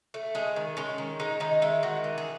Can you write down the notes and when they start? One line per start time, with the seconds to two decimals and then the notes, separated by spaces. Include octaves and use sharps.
0.14 A3
0.35 G#3 G#4
0.56 D#3
0.77 G#3 C#4
0.98 D#3
1.20 G#3 D#4
1.40 D#3 D#4
1.62 G#3 E4
1.83 D#3 F#4
2.04 E3
2.18 G#4